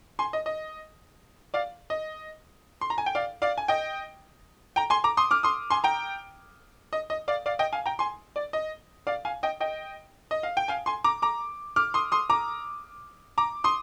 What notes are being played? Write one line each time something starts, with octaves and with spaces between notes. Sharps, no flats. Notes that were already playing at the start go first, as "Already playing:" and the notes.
G#5 C6
D#5
D#5
D5 F5
D#5
C6
A#5
G#5
G5
D5 F5
D5 F5
G#5
D#5 G5
G5 A#5
G#5 C6
A#5 D6
C6 D#6
D6 F6
C6 D#6
G#5 C6
G5 A#5
D#5
D#5
D5 F5
D5 F5
D#5 G5
F5 G#5
G5 A#5
G#5 C6
D5
D#5
D5 F5
F5 G#5
D#5 G5
D#5 G5
D#5
F5
G5
F5 G#5
G#5 C6
A#5 D6
A#5 D6
D6 F6
C6 D#6
C6 D#6
A#5 D6
A#5 D6
C6 D#6